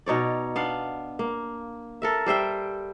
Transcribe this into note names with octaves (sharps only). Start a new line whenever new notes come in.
B2 D#4 C#5 D5
B3 D4 F5
A#3
A4 A#4 E5
G3 C5 E5 G5